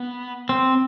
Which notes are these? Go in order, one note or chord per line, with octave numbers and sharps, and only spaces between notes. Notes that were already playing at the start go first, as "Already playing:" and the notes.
Already playing: B3
C4